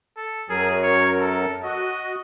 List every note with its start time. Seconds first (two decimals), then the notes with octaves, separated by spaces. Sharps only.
0.17 A4
0.50 F#2 F#3 G#4 A#4
0.83 C#5
1.18 A4
1.63 F#4 D#5